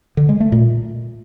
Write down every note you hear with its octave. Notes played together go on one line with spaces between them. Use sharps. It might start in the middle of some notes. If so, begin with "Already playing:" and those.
D3
G#3
A3
A#2